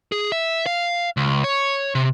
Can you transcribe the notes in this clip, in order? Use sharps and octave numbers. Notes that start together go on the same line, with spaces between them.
G#4
E5
F5
C#2
C#5
C3